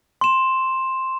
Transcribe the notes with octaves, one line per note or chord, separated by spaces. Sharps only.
C6 E7